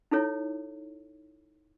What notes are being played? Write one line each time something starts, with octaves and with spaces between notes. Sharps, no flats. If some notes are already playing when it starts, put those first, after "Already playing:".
D#4 E4 A4 C#5